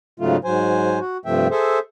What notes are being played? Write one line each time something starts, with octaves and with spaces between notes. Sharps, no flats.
G#2 C#3 F#3 A3 F4
G#2 F#3 C5 G#5
F#4
G2 C3 F3 A3 E5 G5
G#4 A4 C5 E5